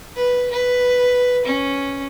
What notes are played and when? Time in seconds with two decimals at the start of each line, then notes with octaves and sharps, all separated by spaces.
0.16 B4
0.51 B4
1.45 C#4